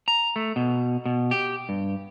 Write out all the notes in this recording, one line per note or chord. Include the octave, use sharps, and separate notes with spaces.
A#5
A3
B2
B2
G4
G2